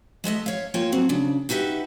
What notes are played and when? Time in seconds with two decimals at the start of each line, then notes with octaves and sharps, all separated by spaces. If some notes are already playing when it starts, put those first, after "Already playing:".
0.24 G#3 A3 D#5 E5
0.46 C#5 F5
0.74 A#3 F4 C#5 G5
0.92 F#3 C4 F#4
1.09 C#3 D4
1.49 D#4 F#4 G4 B4 E5